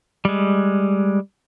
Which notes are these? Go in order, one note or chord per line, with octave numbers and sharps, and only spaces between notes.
G3 G#3